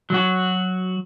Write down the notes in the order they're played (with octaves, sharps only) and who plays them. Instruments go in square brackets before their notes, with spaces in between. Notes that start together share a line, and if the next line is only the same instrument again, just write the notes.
[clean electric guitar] F#3 F#4